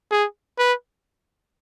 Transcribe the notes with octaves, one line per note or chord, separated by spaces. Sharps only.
G#4
B4